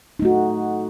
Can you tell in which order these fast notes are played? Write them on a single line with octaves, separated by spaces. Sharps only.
D#4 A3 F#4